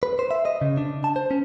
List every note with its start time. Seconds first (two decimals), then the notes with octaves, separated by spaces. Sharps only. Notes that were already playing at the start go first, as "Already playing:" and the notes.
0.03 B4
0.19 C5
0.31 E5
0.45 D#5
0.61 C#3
0.77 D4
1.04 A5
1.16 C5
1.31 C#4